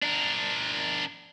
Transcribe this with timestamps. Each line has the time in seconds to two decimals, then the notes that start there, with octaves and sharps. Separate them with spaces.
0.03 D4 A#4